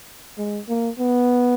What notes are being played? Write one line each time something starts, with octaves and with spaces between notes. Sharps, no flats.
G#3
A#3
B3